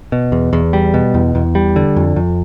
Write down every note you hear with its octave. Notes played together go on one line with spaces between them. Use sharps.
B2
E2
E2
G3
B2
E2
E2
G3
D3
F2
F2